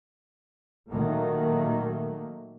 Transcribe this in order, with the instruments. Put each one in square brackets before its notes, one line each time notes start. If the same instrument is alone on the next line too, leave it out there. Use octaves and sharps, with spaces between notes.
[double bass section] A#2 D#3 F#3 A3 A#3